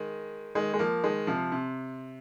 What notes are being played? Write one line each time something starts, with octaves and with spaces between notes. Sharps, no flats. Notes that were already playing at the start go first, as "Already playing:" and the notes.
Already playing: D#3 G#3
D#3 G#3
G#3
F3 A#3
D#3 G#3
C3 F3
C3